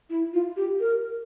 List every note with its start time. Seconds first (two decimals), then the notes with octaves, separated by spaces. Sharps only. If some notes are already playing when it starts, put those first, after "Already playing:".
0.10 E4
0.33 F4
0.57 G4
0.80 A#4